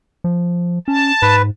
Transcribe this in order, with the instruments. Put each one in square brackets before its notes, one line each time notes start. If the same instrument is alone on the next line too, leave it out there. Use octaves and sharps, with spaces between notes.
[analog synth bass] F3
[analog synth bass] C#4 [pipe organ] A5
[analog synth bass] G#2 [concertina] B4